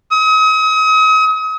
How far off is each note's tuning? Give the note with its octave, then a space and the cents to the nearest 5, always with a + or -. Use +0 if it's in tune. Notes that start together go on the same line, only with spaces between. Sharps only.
D#6 +40